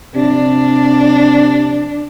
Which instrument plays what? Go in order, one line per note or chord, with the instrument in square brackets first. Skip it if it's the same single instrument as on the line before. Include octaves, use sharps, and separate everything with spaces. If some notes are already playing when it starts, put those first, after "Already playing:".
[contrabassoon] C3 [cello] D4